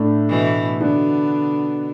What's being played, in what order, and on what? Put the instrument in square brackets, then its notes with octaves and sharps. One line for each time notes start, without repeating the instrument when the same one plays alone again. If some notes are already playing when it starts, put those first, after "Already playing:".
Already playing: [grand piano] A2 A3 D4
[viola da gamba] B2 E3
[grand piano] B2 B3 D4 [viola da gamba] D3